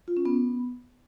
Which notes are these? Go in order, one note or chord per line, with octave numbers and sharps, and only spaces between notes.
F4
C#4
B3